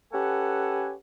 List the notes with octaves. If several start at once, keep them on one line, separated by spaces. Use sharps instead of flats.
C#4 G4 A4 B4 F#5 G#5